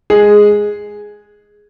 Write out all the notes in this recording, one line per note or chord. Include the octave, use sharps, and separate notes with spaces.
G#3 G#4